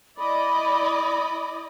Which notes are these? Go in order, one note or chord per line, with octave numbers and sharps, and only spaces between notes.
E4 D5 D#5 B5